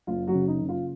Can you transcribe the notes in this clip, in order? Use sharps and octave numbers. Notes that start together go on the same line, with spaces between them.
F#1 F4
F#3 F#4
C#3
D#4
C#3
F4